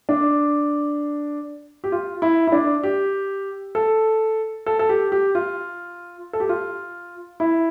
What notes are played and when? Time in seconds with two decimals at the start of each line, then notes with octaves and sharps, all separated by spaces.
0.09 D4
1.84 G4
1.92 F4
2.22 E4
2.47 E4
2.52 D4
2.83 G4
3.75 A4
4.66 A4
4.79 A4
4.89 G4
5.12 G4
5.35 F4
6.33 A4
6.40 G4
6.49 F4
7.40 E4